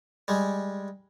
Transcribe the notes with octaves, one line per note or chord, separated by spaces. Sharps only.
G3 G#3